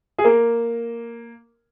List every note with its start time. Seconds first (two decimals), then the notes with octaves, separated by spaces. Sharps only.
0.18 G#4
0.24 A#3 A#4